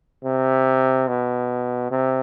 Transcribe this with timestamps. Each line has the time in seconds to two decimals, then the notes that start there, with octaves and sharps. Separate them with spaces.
0.25 C3
1.08 B2
1.91 C3